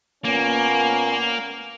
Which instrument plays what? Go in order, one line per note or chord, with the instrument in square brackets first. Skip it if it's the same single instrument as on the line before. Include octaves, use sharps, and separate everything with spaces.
[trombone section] A#2 B3 C#4 [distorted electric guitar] A#3